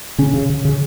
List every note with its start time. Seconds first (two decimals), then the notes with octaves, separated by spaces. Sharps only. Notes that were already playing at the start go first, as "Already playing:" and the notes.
0.18 C#3 C#4
0.34 C#3
0.49 C#3
0.65 C#3